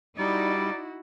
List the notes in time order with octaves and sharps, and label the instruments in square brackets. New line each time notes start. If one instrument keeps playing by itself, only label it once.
[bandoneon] G3 [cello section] D#4 [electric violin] E4 F#4 [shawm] D5